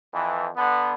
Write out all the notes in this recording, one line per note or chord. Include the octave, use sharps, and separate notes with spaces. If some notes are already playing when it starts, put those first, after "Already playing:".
F2 E3
D3 B3